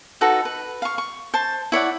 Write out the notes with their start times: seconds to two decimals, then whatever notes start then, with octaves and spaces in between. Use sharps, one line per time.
0.21 D#4 F#4 A4 B4
0.45 B4
0.82 F5 C#6
0.98 C#6
1.34 C5 A5
1.72 E4 C#5 D5 F#5